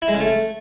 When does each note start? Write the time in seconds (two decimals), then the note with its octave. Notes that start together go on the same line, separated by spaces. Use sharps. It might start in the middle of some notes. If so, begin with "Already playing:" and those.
0.02 E4
0.08 G#3
0.14 C#3
0.21 A3